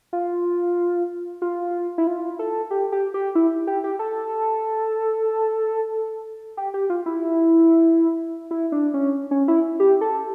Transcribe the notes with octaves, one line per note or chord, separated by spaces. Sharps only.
F4
F4
E4
F4
A4
G4
G4
G4
E4
G4
G4
A4
G4
G4
F4
E4
E4
D4
C#4
C#4
E4
G4
A4